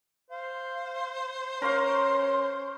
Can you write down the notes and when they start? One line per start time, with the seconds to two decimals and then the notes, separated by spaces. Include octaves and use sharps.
0.30 C5 F5
1.62 C#4 A#4 C#5 F5 C6